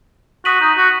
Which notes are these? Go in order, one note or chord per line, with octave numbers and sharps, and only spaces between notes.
F#4 D#6 B6 D#7 F#7
D#4
F#4